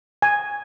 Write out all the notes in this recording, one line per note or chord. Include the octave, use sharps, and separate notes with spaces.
G#5